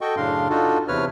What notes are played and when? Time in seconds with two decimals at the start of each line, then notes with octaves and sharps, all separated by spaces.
0.01 F#4 A4 D#5 G5 C#6
0.17 F#2 A2 C#3 D4 F5 C6
0.50 D4 D#4 F4 F#4 A4
0.88 E2 C3 B4 C#5 F6